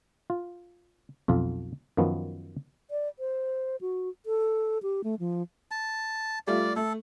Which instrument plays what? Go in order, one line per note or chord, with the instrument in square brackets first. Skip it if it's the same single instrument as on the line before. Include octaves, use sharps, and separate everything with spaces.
[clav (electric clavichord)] F4
B1 F2 F4
F#2 D#3 F3 B3
[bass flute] D5
C5
F#4
A4
G4
A3
F3
[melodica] A5
[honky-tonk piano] G3 A3 F4 [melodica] D5
[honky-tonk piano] A3 [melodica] A4